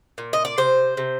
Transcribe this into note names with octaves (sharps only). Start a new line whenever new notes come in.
A#2
D#5
D5
C3 C5
C3